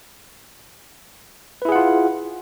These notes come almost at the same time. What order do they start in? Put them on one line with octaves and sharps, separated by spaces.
B4 E4 G#4 F#5 F4